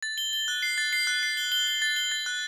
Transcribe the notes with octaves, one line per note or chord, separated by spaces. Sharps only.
A6
G7
G7
F#6
C7
A6
C7
F#6
C7
G7
G7
G7
A6
G7
A6
F#6